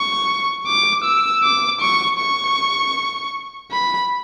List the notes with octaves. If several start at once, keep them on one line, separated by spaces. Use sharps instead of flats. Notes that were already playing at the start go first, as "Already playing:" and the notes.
Already playing: C#6
D6
E6
D6
C#6
C#6
B5